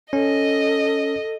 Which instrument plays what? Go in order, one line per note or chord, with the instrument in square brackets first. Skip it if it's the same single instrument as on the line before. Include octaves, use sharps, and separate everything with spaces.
[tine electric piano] C#4 [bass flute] A4 [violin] D#5